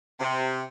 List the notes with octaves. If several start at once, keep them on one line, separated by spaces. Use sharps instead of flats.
C3